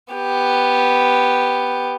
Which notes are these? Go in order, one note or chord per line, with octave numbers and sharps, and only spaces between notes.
B3 G4